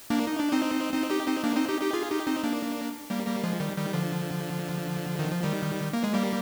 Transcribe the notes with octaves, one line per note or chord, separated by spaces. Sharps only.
A#3 D4
D#4
D4
C4 D#4
C4 D#4
D#4 G4
C4 D#4
A#3 D4
C4 D#4
D#4 G4
D#4 G4
F4 G#4
D#4 G4
C4 D#4
A#3 D4
G3 A#3
G3 A#3
F3 G#3
D#3 G3
D#3 G3
D3 F3
D#3
F3
D#3 G3
A#3
G#3
G3 A#3